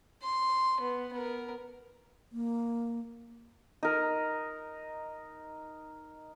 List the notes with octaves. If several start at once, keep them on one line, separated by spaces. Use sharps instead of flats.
C6
B3
B3 A#4
A#3
D#4 A#4